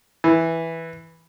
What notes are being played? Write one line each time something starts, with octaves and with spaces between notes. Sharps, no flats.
E3